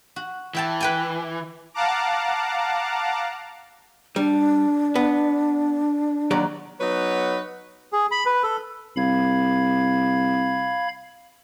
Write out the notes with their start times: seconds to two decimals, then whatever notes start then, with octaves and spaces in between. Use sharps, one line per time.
0.16 F#4
0.55 E3 E5 G5 A5
0.81 B4 G5 G#5
1.74 F5 F#5 A5 A#5 D6
4.16 G3 D4
4.95 B3
6.31 D#2 F#3 D5
6.81 F#3 B3 D#4 B4 C#5 F#5
7.93 G#4
8.11 B5
8.26 B4
8.43 A4
8.96 C2 F5 B5 G#6